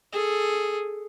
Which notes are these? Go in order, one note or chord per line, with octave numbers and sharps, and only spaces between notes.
G#4 A4